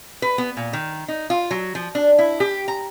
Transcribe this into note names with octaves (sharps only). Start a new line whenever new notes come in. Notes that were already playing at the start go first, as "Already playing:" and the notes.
B4
B3
A#2
D#3
D#4
F4
F#3
F3
D4
E4
G4
A#5